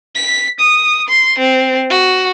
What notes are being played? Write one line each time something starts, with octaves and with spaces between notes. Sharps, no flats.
B6
D#6
C6
C4
F#4